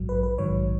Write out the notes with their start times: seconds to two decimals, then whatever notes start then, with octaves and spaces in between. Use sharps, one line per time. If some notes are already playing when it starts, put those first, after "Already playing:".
Already playing: A#1 G#2 F#3
0.09 B4
0.23 B4
0.38 A#1 G#2 D#3 F#3 C#5